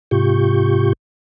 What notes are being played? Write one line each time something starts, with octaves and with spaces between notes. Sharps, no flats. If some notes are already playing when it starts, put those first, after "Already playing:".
G#2 C3 F4 G4 C#6 G6